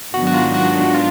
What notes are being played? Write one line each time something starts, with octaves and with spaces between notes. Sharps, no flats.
G#2 D#3 F#3 B3 D4 F#4
F#4
F4
F#4
F4